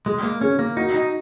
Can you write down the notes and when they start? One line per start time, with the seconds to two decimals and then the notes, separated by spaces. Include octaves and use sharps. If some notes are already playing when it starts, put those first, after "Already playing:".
0.06 G#3 G#4
0.23 A#3
0.41 C#4 G#4
0.59 A#3
0.76 D#4 F#4
0.94 D#4